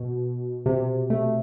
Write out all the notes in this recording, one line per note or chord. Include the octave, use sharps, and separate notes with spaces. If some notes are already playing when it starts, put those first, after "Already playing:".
Already playing: B2
C3
A3